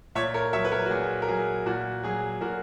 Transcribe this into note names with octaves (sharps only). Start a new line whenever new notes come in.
A#2 C#5 E5
A#4 C#5
F#3 C#5 E5
B4
A#4 C#5
F#4
A#2 G#4
A#4
F#3 G#4
A#2 F#4
F#3 G#4
A#2 F#4 A#4